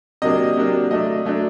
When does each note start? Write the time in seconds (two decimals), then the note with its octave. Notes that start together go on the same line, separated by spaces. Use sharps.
0.22 C3 F#3 A#3 D4 D#5
0.56 C3 F#3 A#3 D4
0.91 F#3 A3 D4 D#5
1.25 F#3 A3 D4